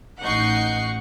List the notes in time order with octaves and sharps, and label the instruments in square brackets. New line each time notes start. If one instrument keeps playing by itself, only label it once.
[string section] A1 D#4 F#5 C#6 G6 C7